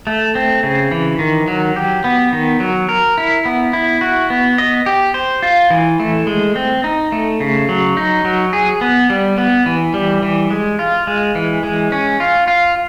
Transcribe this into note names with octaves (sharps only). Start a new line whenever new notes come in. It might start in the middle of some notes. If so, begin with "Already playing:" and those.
A3
C4
C#3
E3
D#3
F#3
G4
B3
D#3
F#3
A#4
E4
B3
E4
F#4
B3
D#5
G4
C5
F4
E3
A3
G#3
C4
D#4
A3
C#3
F#3
D#4
F#3
G#4
B3
G3
B3
E3
G3
E3
G#3
F4
G#3
E3
G#3
C#4
F4
F4